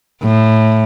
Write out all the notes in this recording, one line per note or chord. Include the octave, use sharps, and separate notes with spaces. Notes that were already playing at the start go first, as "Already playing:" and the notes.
A2